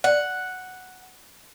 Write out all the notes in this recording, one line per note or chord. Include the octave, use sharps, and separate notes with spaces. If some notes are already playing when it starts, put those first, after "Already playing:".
F#5